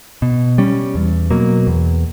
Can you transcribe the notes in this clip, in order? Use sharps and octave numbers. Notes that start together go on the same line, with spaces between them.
B2
G3 C#4
E2
B2 F#3 A#3
E2